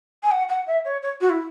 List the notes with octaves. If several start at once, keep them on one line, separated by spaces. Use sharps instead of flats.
G#5
F#5
F#5
E5
C#5
C#5
F#4
E4